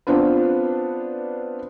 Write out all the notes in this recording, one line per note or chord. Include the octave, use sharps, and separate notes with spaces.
B3 C4 D4 F4 B4